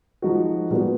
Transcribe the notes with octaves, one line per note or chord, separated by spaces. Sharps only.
F3 G#3 D#4 F#4
A#2 G#3 B3 F#4 B4